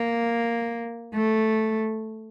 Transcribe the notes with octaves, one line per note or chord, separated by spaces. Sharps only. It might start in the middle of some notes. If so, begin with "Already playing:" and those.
Already playing: A#3
A3